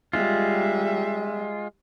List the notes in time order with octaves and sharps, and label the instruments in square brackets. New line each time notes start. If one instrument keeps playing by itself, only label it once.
[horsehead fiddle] G3 E5 [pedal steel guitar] G#3 F4